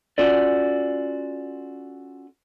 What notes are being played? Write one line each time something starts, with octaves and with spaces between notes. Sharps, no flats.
C#4 F4 F#4 A4 D5